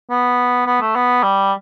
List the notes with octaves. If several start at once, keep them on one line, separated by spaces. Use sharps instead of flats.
B3
B3
A3
B3
G3